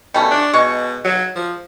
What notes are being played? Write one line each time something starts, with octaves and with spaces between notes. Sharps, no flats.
B2 G3 A3 C#4
D4
B2 G#3 C#6
F#3
F3